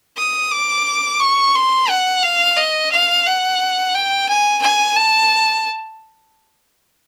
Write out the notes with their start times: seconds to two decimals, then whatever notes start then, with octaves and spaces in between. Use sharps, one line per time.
0.17 D#6
0.51 D6
1.20 C#6
1.55 C6
1.89 F#5
2.23 F5
2.57 D#5
2.92 F5
3.26 F#5
3.94 G5
4.28 G#5
4.62 G#5
4.96 A5